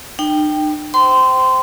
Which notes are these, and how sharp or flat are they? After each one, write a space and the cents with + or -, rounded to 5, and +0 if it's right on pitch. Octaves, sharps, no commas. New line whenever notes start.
D#4 -45 G5 +0
C5 -10 G5 -20 C6 -20